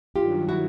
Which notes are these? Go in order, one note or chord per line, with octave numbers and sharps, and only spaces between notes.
G2 D#3 F#3 F4 G4
E4 F#4